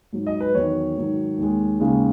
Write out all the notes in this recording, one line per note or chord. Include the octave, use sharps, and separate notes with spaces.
G#2 F#3
D#5
B4
E2 D#3 F#3 C#5
G#2 D#3 F#3
D#2 D#3 G#3
D#2 C#3 G#3